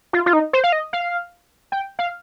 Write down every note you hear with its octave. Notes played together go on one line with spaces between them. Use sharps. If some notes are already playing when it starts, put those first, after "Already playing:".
F4
F4
D#4
C5
F5
D#5
F5
G5
F5